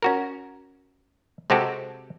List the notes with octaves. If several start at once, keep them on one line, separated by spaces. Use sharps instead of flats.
C#4 F#4 A#4
C3 G#3 C4 F#4 G4 A4